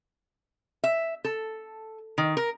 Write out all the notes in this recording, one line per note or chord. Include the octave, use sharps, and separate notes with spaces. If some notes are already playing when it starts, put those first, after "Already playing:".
E5
A4
D#3
A#4